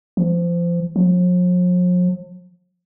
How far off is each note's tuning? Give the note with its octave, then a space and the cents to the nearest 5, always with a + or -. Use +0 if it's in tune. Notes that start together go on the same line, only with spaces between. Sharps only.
F3 -25
F3 +45